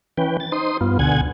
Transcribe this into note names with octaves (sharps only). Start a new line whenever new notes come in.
E3 C#4 B4 G5
A6
D#4 C5 C6 D#6
G2 B3 F4
D2 B2 D3 F#5 G#5 G#6